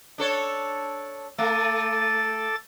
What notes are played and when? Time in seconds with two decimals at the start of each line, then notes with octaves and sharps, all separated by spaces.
0.18 D4 A4 C#5
1.38 A3 A4 D6 A6